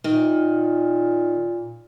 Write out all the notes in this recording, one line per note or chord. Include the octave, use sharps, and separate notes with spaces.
A#2 D#3